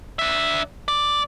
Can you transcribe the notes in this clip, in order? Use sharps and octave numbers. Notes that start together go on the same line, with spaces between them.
D4 E5
D5